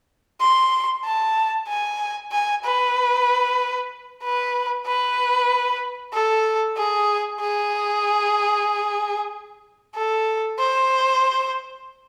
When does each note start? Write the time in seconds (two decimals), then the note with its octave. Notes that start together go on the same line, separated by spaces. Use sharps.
0.41 C6
1.05 A5
1.68 G#5
2.32 G#5
2.65 B4
4.23 B4
4.86 B4
6.14 A4
6.77 G#4
7.41 G#4
9.95 A4
10.59 C5